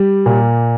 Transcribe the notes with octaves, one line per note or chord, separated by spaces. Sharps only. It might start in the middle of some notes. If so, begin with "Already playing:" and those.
Already playing: G3
A#2